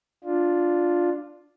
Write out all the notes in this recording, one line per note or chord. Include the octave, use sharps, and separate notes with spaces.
D4 F4